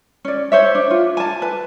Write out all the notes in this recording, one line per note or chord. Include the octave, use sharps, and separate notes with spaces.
C#4 D5
C5 C#5 E5
D4
F4
G#5 A5
B4